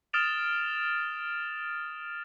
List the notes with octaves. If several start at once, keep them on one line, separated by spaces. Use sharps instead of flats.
D#6 F6 A6 D7 E7 F7